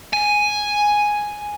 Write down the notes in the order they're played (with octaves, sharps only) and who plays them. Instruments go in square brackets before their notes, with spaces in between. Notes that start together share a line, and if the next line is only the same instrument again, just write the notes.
[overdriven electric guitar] G#5